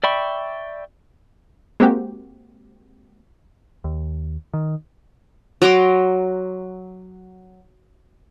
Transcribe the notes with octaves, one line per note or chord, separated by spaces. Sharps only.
D5 E5 G5 B5 C#6
G#3 A#3 C4 F#4 G4
D#2
D#3
F#3 A#5 C6 D6